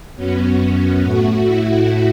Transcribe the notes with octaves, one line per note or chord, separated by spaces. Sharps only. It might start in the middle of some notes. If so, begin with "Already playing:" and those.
F#2 F#3 B3 C#4
A2 A3 F#4
E4